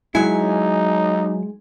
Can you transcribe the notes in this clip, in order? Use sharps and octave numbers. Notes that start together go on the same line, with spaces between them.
F#3 G#3 D#4 E4 G#5